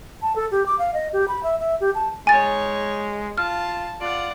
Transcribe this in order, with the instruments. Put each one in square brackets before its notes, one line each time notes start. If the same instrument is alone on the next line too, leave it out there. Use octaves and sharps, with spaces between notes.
[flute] A5
A4
G4
D6
F5
D#5
G4
B5
E5
E5
G4
A5
[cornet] G#3 [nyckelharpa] D#4 C#5 [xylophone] G#5 A6
[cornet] F4 [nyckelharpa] A5 [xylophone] F6
[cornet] F4 [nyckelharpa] D5 F#5